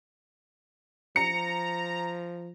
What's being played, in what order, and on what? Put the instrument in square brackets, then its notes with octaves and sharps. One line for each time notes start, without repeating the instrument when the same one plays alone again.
[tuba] F3 [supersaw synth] A#5 [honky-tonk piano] C#7